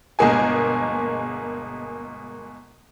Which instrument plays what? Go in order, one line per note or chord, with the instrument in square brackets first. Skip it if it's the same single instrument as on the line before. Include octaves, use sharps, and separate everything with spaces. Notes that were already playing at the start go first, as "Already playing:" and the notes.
[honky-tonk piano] G1 B2 G#3 A#3 G#4 G#5